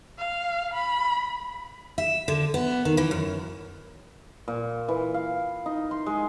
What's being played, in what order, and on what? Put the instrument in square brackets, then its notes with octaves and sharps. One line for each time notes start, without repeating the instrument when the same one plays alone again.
[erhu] F5
B5
[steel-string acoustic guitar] E5
D3
B3
D#3
E3
F#2
[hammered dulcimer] A#2
E3
F5
D#4
C6
G#3